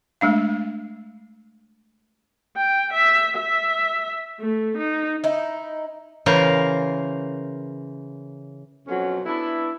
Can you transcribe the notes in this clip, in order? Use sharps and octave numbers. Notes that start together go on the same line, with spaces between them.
G#3 A3 D4 F5
G5
E5
E5
A3
D#4
D#4 E4
C#3 E3 A#4 C5 F5
F2 B2 F#3 C#4
B3 D4 E4